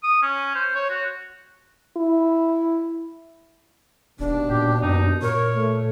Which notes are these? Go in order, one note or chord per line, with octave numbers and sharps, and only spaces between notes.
D#6
C#4
C5
C#5
F#4
E4
D#1 D#2 B2 D4
A#2 G4
F#2 D#4
A#2 A#4 C#5
A3